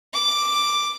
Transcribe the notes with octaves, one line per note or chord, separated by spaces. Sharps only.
D6